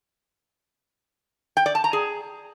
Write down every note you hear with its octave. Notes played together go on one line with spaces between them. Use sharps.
G5
D5
A5
A#5
G#4